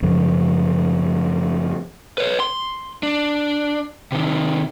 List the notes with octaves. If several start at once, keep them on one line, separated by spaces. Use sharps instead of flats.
F#2 C#3 F3 G#3
B4 C#5
C6
D4
C3 D#3